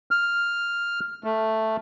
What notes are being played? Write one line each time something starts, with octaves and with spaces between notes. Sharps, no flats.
F6
A3